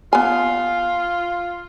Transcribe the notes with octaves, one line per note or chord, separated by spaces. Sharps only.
B3 F4 G#5